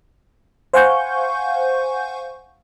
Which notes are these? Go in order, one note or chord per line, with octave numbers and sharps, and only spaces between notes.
C5 F5 F#5 G#5 C#6 G6